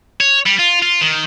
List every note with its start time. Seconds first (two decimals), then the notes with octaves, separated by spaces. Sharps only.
0.21 C#5
0.46 G3
0.59 F4
0.82 F4
1.01 D#3